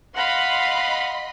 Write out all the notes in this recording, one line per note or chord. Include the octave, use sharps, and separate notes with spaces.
D#5 F5 F#5 B5 C6